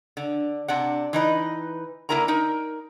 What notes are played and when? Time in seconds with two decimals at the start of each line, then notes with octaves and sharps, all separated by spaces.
0.17 D3
0.68 C3 D4 F#5
1.13 E3 D#4 B4
2.09 D3 A#3 E4 A#4 G#5 A#5
2.28 D#4 A#4